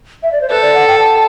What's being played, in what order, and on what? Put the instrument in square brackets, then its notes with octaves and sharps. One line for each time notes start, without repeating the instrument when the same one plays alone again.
[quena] E5
D5
C5
[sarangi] A4 [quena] B4
[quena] D5
F#5
G5
A5